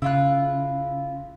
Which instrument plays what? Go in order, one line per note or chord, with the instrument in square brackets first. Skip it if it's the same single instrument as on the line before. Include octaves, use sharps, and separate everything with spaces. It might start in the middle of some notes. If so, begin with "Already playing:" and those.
[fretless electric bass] C#3 [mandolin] E4 F4 F#6